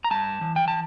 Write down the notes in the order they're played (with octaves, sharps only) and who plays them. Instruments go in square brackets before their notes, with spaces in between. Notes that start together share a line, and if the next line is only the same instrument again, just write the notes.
[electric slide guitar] A#5
G2 A5
E3
G5
A5